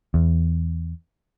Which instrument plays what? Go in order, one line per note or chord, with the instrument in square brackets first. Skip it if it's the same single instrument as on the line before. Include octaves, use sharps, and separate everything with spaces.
[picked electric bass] E2